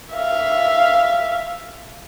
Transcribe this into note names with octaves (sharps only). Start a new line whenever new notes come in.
E5 F5